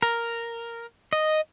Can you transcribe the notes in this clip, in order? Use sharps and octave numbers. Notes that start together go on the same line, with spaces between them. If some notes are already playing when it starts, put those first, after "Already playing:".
A#4
D#5